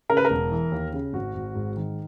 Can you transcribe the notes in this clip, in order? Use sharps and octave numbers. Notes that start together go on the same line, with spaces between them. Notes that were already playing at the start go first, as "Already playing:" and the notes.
C#3 A#4
B4
A#4
E1
E3
D#2
C#3
G#1 F#4
G#1
G#2
D#3